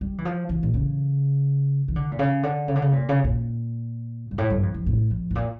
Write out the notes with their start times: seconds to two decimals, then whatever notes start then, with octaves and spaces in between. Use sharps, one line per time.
0.01 G3
0.18 E3
0.25 F3
0.49 E3
0.63 A#2
0.74 C#3
1.88 E3
1.96 D3
2.12 A#2
2.19 C#3
2.43 D3
2.68 C#3
2.76 D3
2.82 C#3
2.92 A#2
3.09 C#3
3.24 A#2
4.31 G2
4.38 A2
4.50 G2
4.63 F2
4.74 F2
4.86 A2
5.10 F2
5.31 A2
5.35 A#2